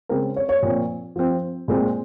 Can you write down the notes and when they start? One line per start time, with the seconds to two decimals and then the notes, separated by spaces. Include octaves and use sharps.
0.09 C#3 G#3 C4 A#4
0.36 C#5
0.49 C#5
0.63 A#2 F3 C4
1.16 F3 C4
1.68 A#2 G#3 C4